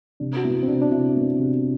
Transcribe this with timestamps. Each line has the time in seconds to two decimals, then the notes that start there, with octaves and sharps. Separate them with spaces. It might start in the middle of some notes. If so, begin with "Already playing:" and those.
0.20 C3 D4
0.37 F#4
0.44 B3 E4
0.63 C4
0.68 C3 D4
0.82 D4
0.92 C3 E4
1.16 B3
1.39 C3